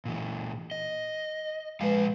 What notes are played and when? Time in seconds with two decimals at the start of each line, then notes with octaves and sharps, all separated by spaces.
0.05 A#2 E3
0.71 D#5
1.81 A#2 F3 G#3 B4 F5